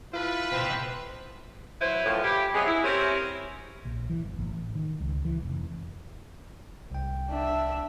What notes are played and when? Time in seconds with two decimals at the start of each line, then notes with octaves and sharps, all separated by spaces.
0.13 E4 F4 A4 B4
0.52 B2 C4 C5
1.81 F#3 E4 B4 C5
2.06 F#2 A2 F3
2.23 E4 G4
2.53 F#3 G#3 B3 C4 G#4
2.66 E4
2.84 C4 C#4 E4 G4 A#4
3.85 A#1
4.10 E3
4.24 G1
4.38 A1
4.75 D#3
5.01 C#2
5.25 E3
5.43 F1
6.91 C2 G5
7.30 D4 E5